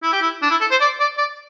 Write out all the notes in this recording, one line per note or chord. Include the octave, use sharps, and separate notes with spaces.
E4
G4
E4
D4
E4
A4
C5
D5
D5
D5